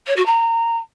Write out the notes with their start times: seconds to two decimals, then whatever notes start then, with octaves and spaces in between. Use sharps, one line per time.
0.06 C#5
0.16 F#4
0.25 A#5